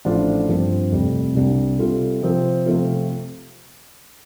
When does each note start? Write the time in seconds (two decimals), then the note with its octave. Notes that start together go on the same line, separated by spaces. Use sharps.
0.05 A1 A2 F3 D4 F4
0.48 G2 F3 C4 F4
0.92 F1 F2 C3 G3
1.35 C2 C3 G3 D4
1.79 C3 G3 F4 A4
2.22 C3 F3 C4
2.66 C3 F3 A3 C4 F4